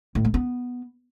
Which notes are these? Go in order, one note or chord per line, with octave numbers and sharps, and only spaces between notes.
A2
A3
B3